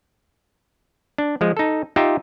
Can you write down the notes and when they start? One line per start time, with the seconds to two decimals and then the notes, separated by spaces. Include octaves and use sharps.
1.18 D4
1.41 F3 G#3
1.57 D#4 A4
1.96 D#4 F4 G4 E5